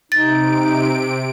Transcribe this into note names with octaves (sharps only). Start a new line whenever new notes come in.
C3 D#4 A6 D7